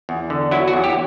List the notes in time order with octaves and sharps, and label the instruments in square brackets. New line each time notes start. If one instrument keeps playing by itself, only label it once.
[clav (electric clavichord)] E2
D3
F#3 E4
F#4
E2
G4